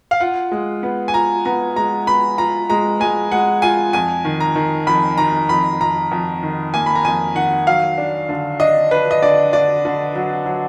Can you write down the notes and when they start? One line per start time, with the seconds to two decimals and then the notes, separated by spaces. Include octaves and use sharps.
0.11 F5
0.20 F4 F#5
0.52 G#3
0.83 B3
1.08 G#5
1.14 F4 A#5
1.45 B3 A#5
1.76 G#3 A#5
2.07 B3 B5
2.38 F4 A#5
2.70 G#3 A#5
3.00 G#3 G#5
3.32 G#3 F#5
3.62 F4 G#5
3.93 F2 G#5
4.25 D#3
4.40 A#5
4.55 D#3
4.87 F2 B5
5.18 D#3 A#5
5.49 F2 B5
5.81 F2 A#5
6.11 F2
6.43 D#3
6.74 A#3 G#5
6.86 B5
6.95 A#5
7.05 F2 G#5
7.35 D#3 F#5
7.67 F#3 F5
7.98 D4
8.29 D3
8.60 D4 D#5
8.91 D4 B4
9.11 D#5
9.22 D3 D5
9.53 D3 D5
9.85 D3
10.16 F#3
10.46 F#3